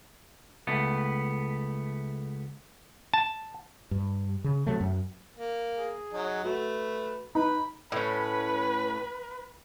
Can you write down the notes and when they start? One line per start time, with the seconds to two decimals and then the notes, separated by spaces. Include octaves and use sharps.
0.67 C#2 A3 B3
3.14 A5
3.91 G2
4.44 C#3
4.66 C3 F#3 A3
4.80 F#2
5.36 A#3
5.78 G#4
6.13 F#3 D#4
6.44 A3 F#4 B4
7.35 D#4 B4 B5
7.92 A2 C#4 B4